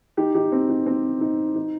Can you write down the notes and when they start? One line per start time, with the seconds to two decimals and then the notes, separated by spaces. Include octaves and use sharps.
0.17 D#4 G4
0.35 D#4 G4
0.52 C4
0.69 D#4
0.86 C4
1.21 D#4
1.56 D#4